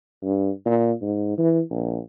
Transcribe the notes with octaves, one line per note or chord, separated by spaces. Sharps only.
G2
A#2
G#2
E3
A#1